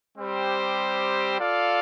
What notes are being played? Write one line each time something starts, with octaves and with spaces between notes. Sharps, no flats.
G3 C4 G4 C5
F4 A4 D5 F5